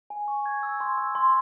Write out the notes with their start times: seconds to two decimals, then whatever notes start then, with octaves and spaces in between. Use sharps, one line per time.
0.10 G#5
0.28 C#6
0.46 G#6
0.63 E6
0.80 C6
0.98 E6
1.15 C6